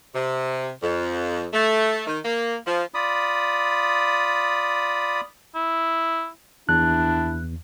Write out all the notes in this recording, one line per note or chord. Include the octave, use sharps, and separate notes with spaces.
C3
F2
A3
D#3
A#3
F3
F4 D5 B5 D#6
E4
E2 D4 E4 F#6